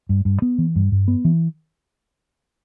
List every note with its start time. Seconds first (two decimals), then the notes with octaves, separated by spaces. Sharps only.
0.09 G2
0.25 G2
0.42 B3
0.58 E3
0.76 G2
0.92 G2
1.08 B3
1.25 E3